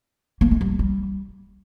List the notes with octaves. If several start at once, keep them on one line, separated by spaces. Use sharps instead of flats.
A#3
G#3
G3
G3